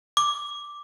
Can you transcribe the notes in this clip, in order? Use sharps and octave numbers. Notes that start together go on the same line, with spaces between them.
D6